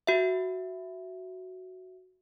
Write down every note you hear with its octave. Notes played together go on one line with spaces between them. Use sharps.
F#4 E5